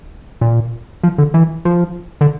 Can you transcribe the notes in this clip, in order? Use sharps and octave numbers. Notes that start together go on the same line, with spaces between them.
A#2
F3
D3
E3
F3
D3